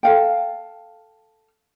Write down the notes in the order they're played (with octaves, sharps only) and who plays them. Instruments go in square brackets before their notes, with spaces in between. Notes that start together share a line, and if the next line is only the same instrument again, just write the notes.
[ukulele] A4 F5 G5